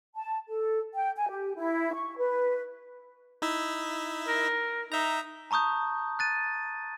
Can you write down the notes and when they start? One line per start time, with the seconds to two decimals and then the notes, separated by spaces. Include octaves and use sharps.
0.15 A5
0.48 A4
0.95 G5
1.15 G#5
1.28 G4
1.55 E4
1.93 C#6
2.17 B4
3.42 D#4 E4 E5
4.28 A#4
4.92 D#4 E5 A#5
5.51 A5 A#5 C#6 D#6 G6
6.19 F#6 A6 D#7